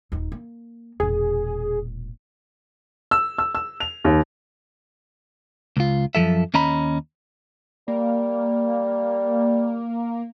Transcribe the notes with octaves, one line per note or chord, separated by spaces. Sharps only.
D#1 D#4
A#3
E1 A#2 G#4
E6
E6
E6
F7
D#2
C#2 F4
F#2 C3 F3 A4 E5
D#2 C#4 D#5 A#5 B5
G3 A#3